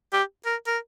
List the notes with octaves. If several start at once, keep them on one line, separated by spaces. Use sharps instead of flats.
G4
A#4
A#4